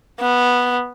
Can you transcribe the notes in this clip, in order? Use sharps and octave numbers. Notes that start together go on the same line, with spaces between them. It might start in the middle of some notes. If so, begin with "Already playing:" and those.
B3